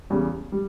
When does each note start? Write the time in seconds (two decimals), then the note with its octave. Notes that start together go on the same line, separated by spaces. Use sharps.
0.10 E2 C#3 G3
0.52 G3